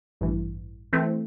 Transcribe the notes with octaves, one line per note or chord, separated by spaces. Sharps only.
A1 G2 E3
E3 A3 C4